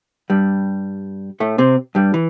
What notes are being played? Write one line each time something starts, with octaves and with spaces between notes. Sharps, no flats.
G2 G3
A2 A3
C3 C4
G2 G3
E3